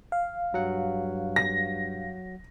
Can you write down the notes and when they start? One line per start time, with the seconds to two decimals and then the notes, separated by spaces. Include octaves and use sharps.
0.12 F5
0.54 G2 F#3 F#5
1.36 A#6